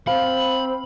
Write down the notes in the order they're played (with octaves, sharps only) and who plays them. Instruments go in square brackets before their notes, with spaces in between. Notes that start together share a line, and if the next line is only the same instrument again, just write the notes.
[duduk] C4 [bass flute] C5 [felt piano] F5 [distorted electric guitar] B5